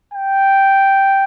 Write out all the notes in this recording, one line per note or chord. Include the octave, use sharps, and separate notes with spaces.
G5